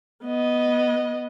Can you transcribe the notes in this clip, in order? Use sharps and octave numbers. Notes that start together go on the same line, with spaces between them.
B3 D#5